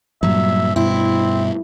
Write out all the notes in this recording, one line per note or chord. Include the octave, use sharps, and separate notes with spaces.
G2 A#2 F#3 E5
G2 B2 C4 E4